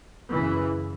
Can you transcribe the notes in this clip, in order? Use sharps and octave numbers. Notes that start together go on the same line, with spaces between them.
F#2 C#3 E3